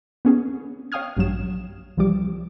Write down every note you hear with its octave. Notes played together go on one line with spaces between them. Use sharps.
B3 C#4 G#4
C#5 F5 G5 D#6 F6 G#6
A#1 G2 F#3 E7
C2 E3 F3 G3 D6